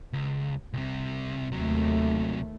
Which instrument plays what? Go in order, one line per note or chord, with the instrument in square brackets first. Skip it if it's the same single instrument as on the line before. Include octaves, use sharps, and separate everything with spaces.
[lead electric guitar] C#2
C2 C3
[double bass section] D#2 A3 [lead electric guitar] C3 F#3